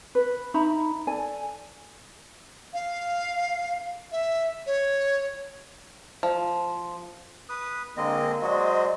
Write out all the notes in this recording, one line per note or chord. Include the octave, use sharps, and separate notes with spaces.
B4
D#4 E5 A#5 B5
A4 D5 G#5
F5
E5
C#5
F3
B4 D#6
D3 G#3 A#3 C4 D#5
F#3 G#3 F#4 C5 D5 D#5